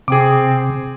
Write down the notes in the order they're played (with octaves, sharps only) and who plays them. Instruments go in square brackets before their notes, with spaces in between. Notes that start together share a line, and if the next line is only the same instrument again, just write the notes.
[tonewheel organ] C3 [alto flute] C4 [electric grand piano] G#4 D6